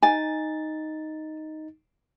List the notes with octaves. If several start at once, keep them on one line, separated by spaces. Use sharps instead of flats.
D#4 G#5 A6